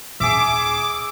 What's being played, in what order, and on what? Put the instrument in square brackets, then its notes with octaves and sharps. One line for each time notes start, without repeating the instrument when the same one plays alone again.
[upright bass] D#1 [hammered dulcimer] G#4 E5 [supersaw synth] D6